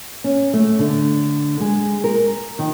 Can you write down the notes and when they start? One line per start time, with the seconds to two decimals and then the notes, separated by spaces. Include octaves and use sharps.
0.24 C#4
0.53 A3
0.79 D3
1.60 G#3
2.04 A#4
2.59 D#3